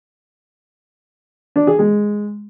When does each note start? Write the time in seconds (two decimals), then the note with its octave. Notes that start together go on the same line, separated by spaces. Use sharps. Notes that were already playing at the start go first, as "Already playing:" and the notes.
1.56 D4
1.67 G#4
1.79 G#3